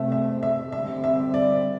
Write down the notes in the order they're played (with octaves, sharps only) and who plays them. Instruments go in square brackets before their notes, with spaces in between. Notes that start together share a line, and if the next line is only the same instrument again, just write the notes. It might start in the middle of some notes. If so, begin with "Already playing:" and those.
Already playing: [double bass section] C3 A3 C4 [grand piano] E5
[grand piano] E5
E5
[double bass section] D3 G3 C4 [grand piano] E5
[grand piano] E5
D5